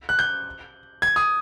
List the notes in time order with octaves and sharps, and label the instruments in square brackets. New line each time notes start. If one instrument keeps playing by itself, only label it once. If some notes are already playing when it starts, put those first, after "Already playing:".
[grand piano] F#6
G6
G#6
D#6